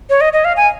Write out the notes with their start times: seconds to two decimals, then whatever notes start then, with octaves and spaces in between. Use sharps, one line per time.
0.10 C#5
0.21 D#5
0.33 D#5
0.45 F5
0.57 G#5